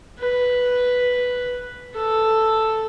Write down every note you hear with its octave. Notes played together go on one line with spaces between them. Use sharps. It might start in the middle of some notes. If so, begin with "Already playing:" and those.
B4
A4